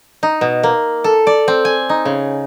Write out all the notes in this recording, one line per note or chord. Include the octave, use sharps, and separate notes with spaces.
D#4
B2
A#3
A4
D5
C4
G#5
D#4
C#3